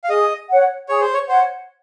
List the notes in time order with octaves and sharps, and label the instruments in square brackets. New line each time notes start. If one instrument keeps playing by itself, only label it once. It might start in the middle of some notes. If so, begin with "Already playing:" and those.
[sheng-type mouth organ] F5
[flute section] G#4 [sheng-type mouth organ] D#5
[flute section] C#5 F#5
[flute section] G#4 [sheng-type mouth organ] C#5
[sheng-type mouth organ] C5
C#5
[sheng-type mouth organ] C5 [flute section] C#5 F#5